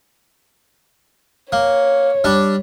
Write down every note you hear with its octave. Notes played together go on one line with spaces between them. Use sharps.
A#3 C#5
G3 D4